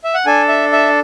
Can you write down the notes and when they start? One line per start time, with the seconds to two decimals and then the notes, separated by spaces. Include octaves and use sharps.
0.04 E5
0.14 F#5
0.26 D4 A4 G#5
0.49 E5
0.73 E5